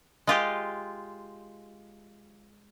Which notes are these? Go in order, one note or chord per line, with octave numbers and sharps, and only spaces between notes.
G#3 F4 G4